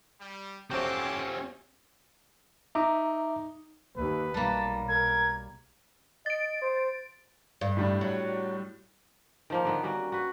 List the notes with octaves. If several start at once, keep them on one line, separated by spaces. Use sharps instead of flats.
G3
F2 C3 F#3 C4 C#4 A5 C6 D6
D#4 E5 A#5 D6
D#2 B4
B1 G3 A#3 A5
A#4 G#6
D#5 A6 D7
C5
G2
A2 G3 D4
F#3
D#3 F3 A#3
D3 D#3 B3
G3 A#3 C#4 F#4
F#4 B4